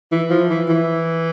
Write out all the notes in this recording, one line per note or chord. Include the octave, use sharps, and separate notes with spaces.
E3
F3
E3
E3